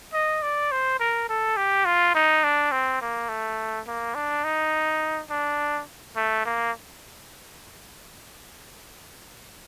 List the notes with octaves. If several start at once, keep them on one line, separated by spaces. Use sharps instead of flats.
D#5
D5
C5
A#4
A4
G4
F4
D#4
D4
C4
A#3
A3
A#3
D4
D#4
D4
A3
A#3